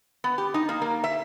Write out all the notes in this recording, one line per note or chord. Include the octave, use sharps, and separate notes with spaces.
B3
G4
D#4
A#3
A#3
E5